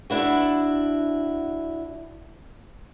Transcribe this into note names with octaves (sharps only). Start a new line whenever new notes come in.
D4 E4 F#4